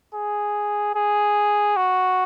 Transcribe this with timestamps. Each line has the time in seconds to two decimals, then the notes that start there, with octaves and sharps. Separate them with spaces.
0.15 G#4
0.95 G#4
1.76 F#4